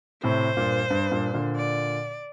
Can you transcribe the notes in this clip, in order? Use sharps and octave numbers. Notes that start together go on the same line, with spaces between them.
A2 C3 C5
G2 A#2
G2
G2 A#2
A#2 D3
D5